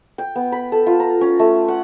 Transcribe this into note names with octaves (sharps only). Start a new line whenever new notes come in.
G5
B3
B5
A4
F4
A#5
C#4
A3
F#5